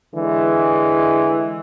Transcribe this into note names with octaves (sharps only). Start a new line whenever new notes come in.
D3 E3 G#3